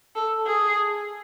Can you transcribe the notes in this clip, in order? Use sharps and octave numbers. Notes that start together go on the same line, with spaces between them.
A4
G#4